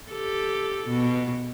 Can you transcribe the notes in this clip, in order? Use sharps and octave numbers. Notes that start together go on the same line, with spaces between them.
G4 A4
B2